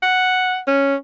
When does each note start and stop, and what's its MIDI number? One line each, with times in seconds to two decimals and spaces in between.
0.02 0.59 78
0.67 0.95 61